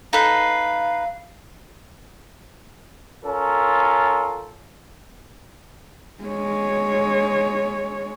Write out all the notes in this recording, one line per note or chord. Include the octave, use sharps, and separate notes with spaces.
D#4 A4 B4 F5
C#4 F4 A4 A#4
G#3 C#5